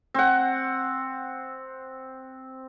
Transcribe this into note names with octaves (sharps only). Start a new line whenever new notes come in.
C4 F#5